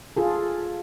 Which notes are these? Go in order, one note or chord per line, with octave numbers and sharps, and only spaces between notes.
F4 G#4 A4